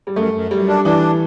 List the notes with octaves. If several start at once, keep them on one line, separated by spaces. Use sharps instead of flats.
G3
F#2 A3
F#2
F#2 G3
D4
E3 D4